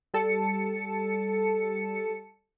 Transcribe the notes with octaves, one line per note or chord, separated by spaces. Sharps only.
G3 A4 A5 C#7